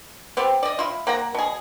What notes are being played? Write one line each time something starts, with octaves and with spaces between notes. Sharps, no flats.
B3 C4 G4
D5 D#5
E4 F4
A#3 F#5 A#5
B2 G#4